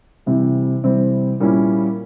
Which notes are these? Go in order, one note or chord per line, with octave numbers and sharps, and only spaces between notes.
C3 E3 G3 C4
C3 E3 G3 C4
A#2 G3 A#3 C#4 E4